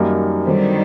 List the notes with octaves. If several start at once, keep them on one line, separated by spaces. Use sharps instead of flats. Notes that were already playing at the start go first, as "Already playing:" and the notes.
Already playing: F#2 D#3 G3 A#3 D#4
D3 D#3 F#3 G3 C4